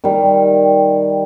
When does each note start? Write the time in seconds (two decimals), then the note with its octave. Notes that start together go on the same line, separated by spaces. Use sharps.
0.04 D#3 G3